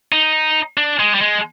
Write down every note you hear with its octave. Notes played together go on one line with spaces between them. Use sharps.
D#4
D4
G#3
G3
G#3